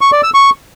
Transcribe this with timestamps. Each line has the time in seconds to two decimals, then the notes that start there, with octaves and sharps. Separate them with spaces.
0.01 C#6
0.12 D5
0.23 E6
0.34 C#6